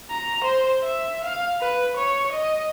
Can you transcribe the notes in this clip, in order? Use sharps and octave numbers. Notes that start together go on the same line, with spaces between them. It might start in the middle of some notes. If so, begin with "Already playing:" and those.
A#5
C5
E5
F5
B4
C#5
D#5